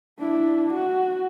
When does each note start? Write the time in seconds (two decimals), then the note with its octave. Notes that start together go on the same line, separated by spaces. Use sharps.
0.19 D4 E4
0.73 F#4